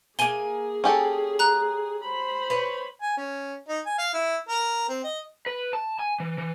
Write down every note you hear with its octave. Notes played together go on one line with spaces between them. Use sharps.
A#3 G#4 G#5 D#7 G7
C#4 G4 A4
A#5 F#6
C5 B5
B4 C#5
G#5
C#4
D#4
G#5
F5
E4
A#4
C4
D#5
B4
A5
G#5
E3
E3